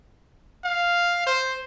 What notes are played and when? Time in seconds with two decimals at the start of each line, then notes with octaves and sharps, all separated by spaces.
0.65 F5
1.27 C5